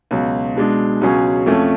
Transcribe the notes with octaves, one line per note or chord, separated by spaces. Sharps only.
C#2 B2 F#3
B2 G#3 D4
C#2 B2 F#3 C#4 G#4
F2 F3 A3 C#4